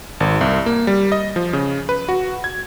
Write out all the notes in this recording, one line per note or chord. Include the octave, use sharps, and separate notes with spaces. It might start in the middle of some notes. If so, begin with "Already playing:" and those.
G#1
C2
A#3
G3
D#5
F3
C#3
B4
F#4
G#6